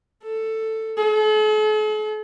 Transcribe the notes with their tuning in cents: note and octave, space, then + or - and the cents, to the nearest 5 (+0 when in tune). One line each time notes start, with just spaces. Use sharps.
A4 +10
A4 -45